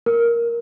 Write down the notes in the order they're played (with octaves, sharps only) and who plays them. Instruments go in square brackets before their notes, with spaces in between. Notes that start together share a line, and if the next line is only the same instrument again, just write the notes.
[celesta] A#4